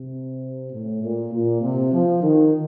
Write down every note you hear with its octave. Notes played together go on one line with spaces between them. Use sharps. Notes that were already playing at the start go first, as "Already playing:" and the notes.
Already playing: C3
A2
A#2
A#2
C3
F3
D#3